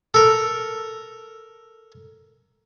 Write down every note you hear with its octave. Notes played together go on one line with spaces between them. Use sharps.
A4 A#4